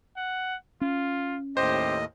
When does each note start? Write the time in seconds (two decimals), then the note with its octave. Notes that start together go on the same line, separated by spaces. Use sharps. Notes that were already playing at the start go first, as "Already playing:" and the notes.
0.17 F#5
0.81 C#4 F4
1.57 D#2 A2 G4 C5 D#5